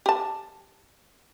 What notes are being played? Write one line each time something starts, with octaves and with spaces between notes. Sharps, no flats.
G4 A5